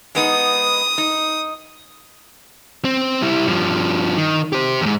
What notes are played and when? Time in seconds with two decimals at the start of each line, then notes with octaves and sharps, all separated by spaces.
0.15 G#3 B3 D#4 D#6
0.98 D#4
2.85 C4
3.22 G3 E4
3.47 G2 F3
4.18 D#3
4.53 G4 C5
4.82 E2 G#2